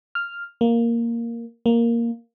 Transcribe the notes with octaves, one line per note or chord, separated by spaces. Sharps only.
F6
A#3
A#3